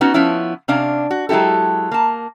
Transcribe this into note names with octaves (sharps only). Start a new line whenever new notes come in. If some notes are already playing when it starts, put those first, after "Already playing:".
B3 C#4 D#4 F#4
F3 B3 C#4 E4
C3 C#4 D4 F5
F#4
F#3 G#3 E4 G4 A4
A#3 A5